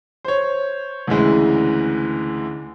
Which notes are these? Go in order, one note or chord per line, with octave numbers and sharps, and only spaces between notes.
C5 C#5
D2 C#3 E3 G#3